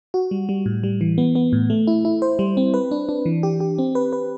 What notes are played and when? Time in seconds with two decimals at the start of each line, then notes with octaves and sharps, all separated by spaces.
0.14 F#4
0.31 G3
0.49 G3
0.66 A2
0.83 G3
1.01 E3
1.18 B3
1.35 B3
1.53 A2
1.70 A3
1.87 E4
2.05 E4
2.22 C5
2.39 G3
2.57 C4
2.74 B4
2.91 D4
3.09 D4
3.26 E3
3.43 G4
3.60 G4
3.78 C4
3.95 B4
4.13 B4